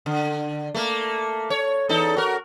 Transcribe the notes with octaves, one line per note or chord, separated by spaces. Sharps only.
D3
A3 A#3
C#5
E2 D#4 A4
F#4 A#4